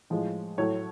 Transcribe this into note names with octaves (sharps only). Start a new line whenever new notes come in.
A2 F3 G#3
A2 F#3 A3 C#5